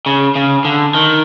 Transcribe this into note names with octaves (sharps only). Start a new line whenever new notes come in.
C#3
C#3
D3
D#3